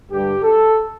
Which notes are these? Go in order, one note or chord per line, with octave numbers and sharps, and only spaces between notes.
G2 D3 G3 G4
A4